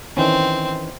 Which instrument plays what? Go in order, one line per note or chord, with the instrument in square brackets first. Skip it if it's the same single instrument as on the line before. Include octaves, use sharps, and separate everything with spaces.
[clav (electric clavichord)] D#3 E3 C#4 [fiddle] C4